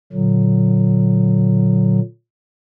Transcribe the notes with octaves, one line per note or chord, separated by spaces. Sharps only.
A#2 D3 F#3